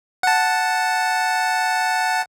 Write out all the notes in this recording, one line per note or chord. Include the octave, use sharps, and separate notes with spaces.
F#5 A5